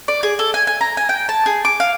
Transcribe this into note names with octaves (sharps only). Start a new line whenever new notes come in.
D5
G#4
A4
G#5
G#5
A#5
G#5
G5
A5
G#4
D6
F5